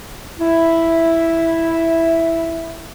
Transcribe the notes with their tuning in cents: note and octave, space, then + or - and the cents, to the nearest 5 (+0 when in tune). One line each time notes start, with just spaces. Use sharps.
E4 +0 E5 +0